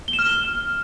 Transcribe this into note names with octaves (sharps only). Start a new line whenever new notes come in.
G7
E7
F6